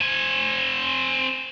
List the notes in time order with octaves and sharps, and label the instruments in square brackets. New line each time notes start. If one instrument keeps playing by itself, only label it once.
[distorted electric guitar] C4 G#5